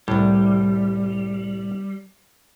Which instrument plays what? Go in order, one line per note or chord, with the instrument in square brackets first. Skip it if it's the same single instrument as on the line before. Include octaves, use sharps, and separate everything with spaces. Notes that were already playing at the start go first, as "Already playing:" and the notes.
[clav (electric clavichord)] C2 A2 [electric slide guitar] G3